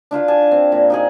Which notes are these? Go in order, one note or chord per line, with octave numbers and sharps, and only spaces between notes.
D4 E4 F4 B4
G#5 A5
C4
A#2
D#4 G4 G#4